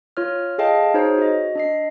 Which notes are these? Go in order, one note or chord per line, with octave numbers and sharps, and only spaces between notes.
F4 C#5 F6
G#4 A4 D#5 F5 G5 A5
D#4 F#4 G#4 C5 C#5
F#4 D#5
D4 D#5 C7